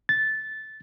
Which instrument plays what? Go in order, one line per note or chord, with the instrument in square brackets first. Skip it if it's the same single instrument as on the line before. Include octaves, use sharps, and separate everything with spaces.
[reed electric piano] A6